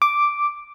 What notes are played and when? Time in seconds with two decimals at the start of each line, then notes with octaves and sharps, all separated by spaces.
0.02 D6